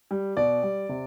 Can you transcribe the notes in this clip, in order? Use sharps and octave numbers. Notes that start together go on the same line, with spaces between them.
G3
B2 D5
G3
C3